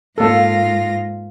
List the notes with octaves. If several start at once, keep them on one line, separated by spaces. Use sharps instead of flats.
G#2 A#3 F4 A4 A#6